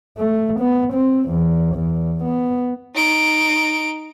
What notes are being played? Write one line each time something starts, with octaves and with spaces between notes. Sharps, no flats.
A3
B3
C4
E2
E2
B3
D#4 D7